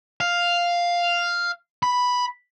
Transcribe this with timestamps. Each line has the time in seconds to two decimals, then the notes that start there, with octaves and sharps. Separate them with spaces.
0.20 F5
1.83 B5